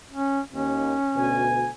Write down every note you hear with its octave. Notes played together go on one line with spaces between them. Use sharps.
C#4
D#2 C#4
D2 B2 G#5